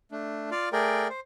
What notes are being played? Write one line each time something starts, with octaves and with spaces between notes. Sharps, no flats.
A3 D4
F4 D5 F5
A3 G#4 A#4 D5 G5
C5